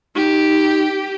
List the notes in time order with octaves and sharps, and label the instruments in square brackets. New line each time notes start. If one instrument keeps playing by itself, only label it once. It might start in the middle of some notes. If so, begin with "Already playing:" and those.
[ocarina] D#4 [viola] G4